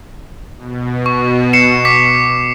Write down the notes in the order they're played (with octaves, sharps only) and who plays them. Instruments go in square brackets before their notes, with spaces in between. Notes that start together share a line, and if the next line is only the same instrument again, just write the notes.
[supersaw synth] B2
[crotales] C#6
C7 C#7 E7
D6 B6